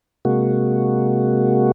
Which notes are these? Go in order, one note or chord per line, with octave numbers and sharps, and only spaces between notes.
C3 G#3 A#3 F#4